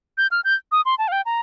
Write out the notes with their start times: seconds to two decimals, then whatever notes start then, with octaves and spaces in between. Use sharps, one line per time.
0.18 G6
0.31 F6
0.45 G6
0.72 D#6
0.85 C6
0.99 A5
1.08 F5
1.12 G5
1.26 A#5